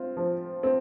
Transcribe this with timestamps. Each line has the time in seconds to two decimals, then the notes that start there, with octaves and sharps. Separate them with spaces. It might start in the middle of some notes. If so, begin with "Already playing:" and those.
Already playing: C4 F4
0.17 F3
0.63 C4